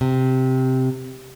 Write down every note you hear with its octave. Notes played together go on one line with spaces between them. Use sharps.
C3